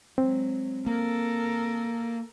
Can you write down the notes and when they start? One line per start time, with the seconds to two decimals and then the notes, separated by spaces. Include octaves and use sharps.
0.18 F#3 G#3 C4
0.86 A#3 A4 A#4